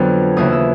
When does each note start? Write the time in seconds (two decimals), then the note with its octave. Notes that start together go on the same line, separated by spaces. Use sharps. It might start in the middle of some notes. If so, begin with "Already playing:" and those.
Already playing: F2 D3 F#3 B3
0.37 D#2 C#3 E3 D#6
0.52 E6